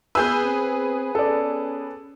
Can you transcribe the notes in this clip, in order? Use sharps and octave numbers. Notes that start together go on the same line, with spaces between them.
B3 G#4 B4 E6 G6
C4
C#4 A4 D5